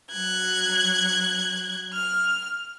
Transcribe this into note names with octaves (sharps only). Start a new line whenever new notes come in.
F#3 F#6 G#6
F6